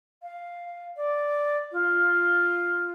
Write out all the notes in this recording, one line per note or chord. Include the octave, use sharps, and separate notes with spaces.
F5
D5
F4